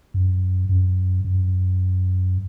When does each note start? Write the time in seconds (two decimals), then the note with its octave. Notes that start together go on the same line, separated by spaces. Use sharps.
0.14 F#2
0.69 F#2
1.24 F#2